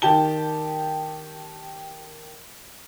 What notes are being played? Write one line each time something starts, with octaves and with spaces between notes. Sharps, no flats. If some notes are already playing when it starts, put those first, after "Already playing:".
D#3 G4 A5 G7